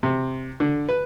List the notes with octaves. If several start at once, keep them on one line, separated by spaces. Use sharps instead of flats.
C3
D3
B4